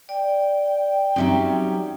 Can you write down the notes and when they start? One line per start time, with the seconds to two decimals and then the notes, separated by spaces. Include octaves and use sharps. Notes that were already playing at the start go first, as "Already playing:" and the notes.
0.09 D5 G5
1.16 F#3 G3 C4 C#4 D#4 E5